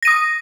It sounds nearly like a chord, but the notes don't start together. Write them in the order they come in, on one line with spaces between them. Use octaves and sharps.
A#6 D#7 D#6